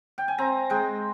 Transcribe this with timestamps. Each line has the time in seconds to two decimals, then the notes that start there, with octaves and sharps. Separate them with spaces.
0.18 G5
0.28 G#5
0.38 C4 A#5
0.70 G#3 G5